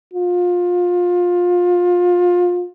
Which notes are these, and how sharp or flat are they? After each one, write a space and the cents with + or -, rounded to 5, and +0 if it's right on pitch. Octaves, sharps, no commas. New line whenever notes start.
F4 +25